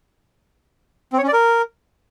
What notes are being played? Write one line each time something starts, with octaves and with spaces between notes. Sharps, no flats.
C4
C#5
C#4
D5
A#4